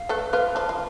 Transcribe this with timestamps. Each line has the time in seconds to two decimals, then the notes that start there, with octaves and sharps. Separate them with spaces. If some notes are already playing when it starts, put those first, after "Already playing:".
Already playing: F5
0.09 A3 A4 B4
0.33 F3 F4 B4
0.55 F3 F4 A5
0.69 F4